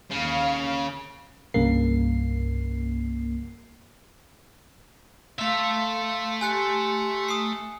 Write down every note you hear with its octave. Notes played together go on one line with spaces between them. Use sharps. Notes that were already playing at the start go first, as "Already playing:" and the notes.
D#2 C#3 F5
C2 G2 C#3 A#3 C7
A3 E5 F5 C6
G4 G#5 C6 F#6 C#7
D#6 C7